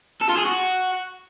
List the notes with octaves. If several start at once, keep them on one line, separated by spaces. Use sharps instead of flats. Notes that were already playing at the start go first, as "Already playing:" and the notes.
A4
F4
G#4
F#4